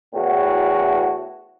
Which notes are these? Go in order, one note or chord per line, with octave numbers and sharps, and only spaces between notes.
E2 A2 F#4